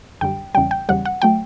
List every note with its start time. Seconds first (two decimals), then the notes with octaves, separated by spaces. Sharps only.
0.21 F#2 D3 G3 G5
0.55 E2 C#3 G3 G5
0.71 G5
0.89 E2 C#3 G3 F#5
1.06 F#5
1.22 F#3 A3 G5